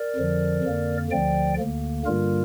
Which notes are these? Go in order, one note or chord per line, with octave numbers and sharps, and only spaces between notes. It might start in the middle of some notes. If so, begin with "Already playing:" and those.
Already playing: A#4 D5
F2 D3 F3
F2 D3 A#3
D2 D3 F3 D5 G5
D2 D3 A#3
G2 D3 G3 A#3 F4 A#4